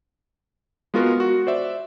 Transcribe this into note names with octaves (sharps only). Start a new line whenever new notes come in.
G#3 B3 F4 F#4 A#4
F#4
C5 D5 E5